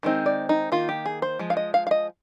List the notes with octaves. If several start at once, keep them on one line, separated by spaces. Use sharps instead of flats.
D#3 G#3 C4 D#4
D5
D#4
D#3 A#3 D#4 F4
G4
G#4
C5
F3 G#3
F5
D#5
F5
F5
D#5